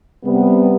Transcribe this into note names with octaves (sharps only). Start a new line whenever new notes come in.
C3 G3 B3